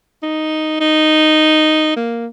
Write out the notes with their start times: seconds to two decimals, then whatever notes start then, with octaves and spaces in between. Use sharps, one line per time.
0.23 D#4
0.81 D#4
1.96 A#3